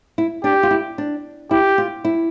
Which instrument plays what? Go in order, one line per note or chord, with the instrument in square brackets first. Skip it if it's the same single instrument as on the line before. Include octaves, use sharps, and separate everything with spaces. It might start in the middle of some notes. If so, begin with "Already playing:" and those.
[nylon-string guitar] E4
[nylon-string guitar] D4 [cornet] G4
[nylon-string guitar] F4
E4
D4
[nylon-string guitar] E4 [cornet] G4
[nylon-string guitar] F4
E4